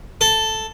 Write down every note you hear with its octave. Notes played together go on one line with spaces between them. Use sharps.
A4